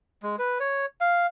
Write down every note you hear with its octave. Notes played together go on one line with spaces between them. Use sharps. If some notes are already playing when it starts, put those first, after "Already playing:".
G#3
B4
C#5
F5